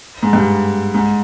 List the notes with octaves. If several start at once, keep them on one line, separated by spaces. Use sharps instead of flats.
G#2
G2
G#2